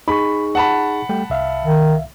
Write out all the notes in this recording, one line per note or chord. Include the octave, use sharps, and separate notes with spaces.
D#4 G#4 B5 C#6
F#5 A5 B5
G3 A3 G5
C2 E5 F5
D#3